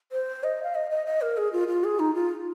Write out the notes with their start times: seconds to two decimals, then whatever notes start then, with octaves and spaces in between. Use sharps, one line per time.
0.12 C5
0.44 D#5
0.63 F5
0.75 D#5
0.91 D#5
1.06 D#5
1.21 A#4
1.37 G#4
1.53 F4
1.68 F4
1.84 G#4
1.99 D#4
2.15 F4